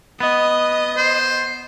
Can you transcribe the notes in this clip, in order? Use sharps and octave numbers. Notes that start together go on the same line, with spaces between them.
B3 D#5
C5